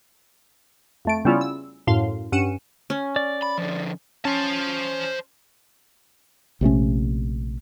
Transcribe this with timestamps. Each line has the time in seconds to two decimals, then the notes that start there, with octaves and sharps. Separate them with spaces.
1.05 F2 A3 D7
1.25 C#3 G3 B3 C#4 E4 F4
1.41 E6
1.87 F#2 A2 F5 C6
2.32 G2 C#4 F#5 C#7 D#7 E7
2.90 C#4
3.16 D5
3.42 B5
3.58 D3 F3
4.25 C#4 C5 A5
6.61 A#1 C3 A3 C#4